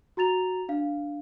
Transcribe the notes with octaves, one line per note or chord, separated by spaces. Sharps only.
F#4 A#5 A6 F7
D4 F5